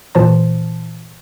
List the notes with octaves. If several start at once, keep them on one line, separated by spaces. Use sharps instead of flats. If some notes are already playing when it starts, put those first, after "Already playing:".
A#2 E3 C5 A5